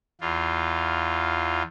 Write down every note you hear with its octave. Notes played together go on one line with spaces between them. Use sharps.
E2 F4